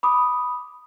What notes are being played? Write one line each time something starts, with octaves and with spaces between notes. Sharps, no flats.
B5 D6 D#6